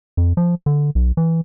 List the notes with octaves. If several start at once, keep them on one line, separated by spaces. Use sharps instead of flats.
F2
F3
D3
B1
E3